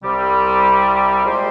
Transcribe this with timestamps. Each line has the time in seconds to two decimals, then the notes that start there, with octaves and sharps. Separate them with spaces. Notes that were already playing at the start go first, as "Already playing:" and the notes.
0.03 C2 C3 G3
1.25 A#2 G#3 C4 G4 C5